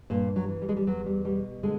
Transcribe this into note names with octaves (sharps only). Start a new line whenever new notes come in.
G2 A#2 A#3
F#3
E3
G3
G#3
G3
E2 F#3
G3
B2 G3
D3 G#3